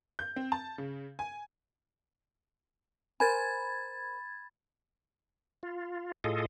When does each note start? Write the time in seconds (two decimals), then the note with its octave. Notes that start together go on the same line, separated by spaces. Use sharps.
0.19 G6
0.36 C4
0.52 A5
0.78 C#3
1.19 G#5
3.20 A#4 C5 G#5 B5 G#6 A6
5.63 F4
6.24 A2 F4 G#4 A4 D#5